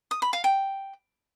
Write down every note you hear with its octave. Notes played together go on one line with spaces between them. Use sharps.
D#6
B5
F5
G5